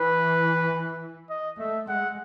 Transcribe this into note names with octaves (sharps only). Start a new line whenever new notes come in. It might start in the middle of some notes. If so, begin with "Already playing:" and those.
Already playing: E3 B4
D#5
A3 E5
G#3 F#5